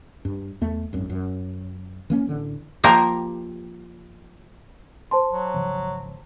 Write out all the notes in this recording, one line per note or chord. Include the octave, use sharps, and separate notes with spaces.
G2
E2 A3
G#1 F#2
F#2
E3 A#3 C#4
A1 D3
F3 A#3 G4 A#4
C5 A5 C6
F#3
G#1 C#3 F3